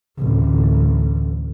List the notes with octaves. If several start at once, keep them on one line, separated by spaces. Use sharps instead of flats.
A1 D2